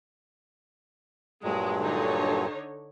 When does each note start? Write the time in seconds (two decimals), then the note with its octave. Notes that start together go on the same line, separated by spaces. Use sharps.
1.44 G2 A#2 F#3 G#3
1.81 D3 D#4 C#5